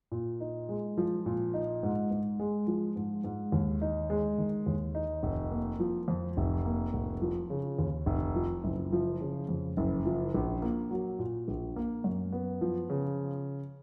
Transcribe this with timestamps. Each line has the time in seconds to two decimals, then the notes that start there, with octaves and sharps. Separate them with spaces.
0.12 A#2
0.40 D#4
0.69 G#3
0.98 F3
1.26 A#2
1.54 D#4
1.83 G#2
2.11 G#2
2.40 G#3
2.67 F3
2.96 G#2
3.24 G#2
3.52 D#2
3.82 D#4
4.10 G#3
4.38 D#3
4.66 D#2
4.95 D#4
5.23 F1
5.51 A#3
5.80 F3
6.08 F2
6.37 F1
6.65 A#3
6.94 F1
7.22 F3
7.50 C#3
7.78 D#2
8.06 F1
8.36 F3
8.64 F#1
8.92 F3
9.20 C#3
9.49 F2
9.77 F#1
10.06 F3
10.34 A#1
10.62 A#3
10.91 F#3
11.19 A#2
11.48 A#1
11.76 A#3
12.04 F#2
12.32 B3
12.61 F3
12.90 C#3